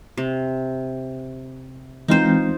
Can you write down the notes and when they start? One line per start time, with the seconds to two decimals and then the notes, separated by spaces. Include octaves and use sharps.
0.18 C3
2.08 E3 G#3 C4 D#4 F4 C5